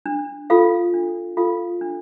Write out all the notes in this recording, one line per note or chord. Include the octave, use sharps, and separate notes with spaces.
D4
F4 A4 F5
D4
F4 A4 F5
D4